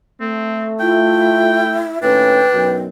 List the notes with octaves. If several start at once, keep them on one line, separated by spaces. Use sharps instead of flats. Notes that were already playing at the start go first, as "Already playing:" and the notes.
A3 C4
E4 F4 G5
D#2 A2 C#4 D4 B4 G5
B1 F#2 B2